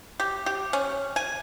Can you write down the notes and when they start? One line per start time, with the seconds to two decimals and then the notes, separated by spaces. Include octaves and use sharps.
0.20 G4
0.46 G4
0.73 C#4
1.16 G#5